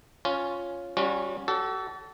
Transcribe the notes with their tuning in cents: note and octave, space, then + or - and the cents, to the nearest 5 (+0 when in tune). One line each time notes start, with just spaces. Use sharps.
C#4 +0 F4 +0
G3 +0 C#4 +0 F#4 -40
F#4 +45 A4 +0